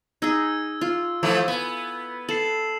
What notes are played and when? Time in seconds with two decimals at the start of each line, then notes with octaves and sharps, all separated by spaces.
0.22 D#4 G#4 E6 G#6
0.81 F4
1.23 E3 F3 A3
1.48 B3 G#5
2.29 A4 C7 E7 F#7